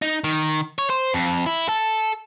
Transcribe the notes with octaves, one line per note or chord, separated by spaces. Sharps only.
D#4
D#3
C#5
C5
F2
E4
A4